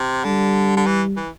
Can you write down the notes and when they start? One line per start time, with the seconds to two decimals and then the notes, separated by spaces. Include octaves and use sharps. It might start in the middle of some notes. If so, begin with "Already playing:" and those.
Already playing: C3
0.24 D3 G3
0.77 D3
0.86 E3
1.16 E3